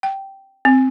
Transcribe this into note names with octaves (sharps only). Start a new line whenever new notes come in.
G5
C4